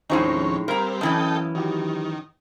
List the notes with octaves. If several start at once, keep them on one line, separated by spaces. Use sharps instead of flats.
D#2 A2 F3 G#3 C4 C#4 D#4 C#5
G3 C4 A#4 F5 A#5 B5 G#6
F#2 E3 C#4 A4 D#5 G5
D#3 F#3 G4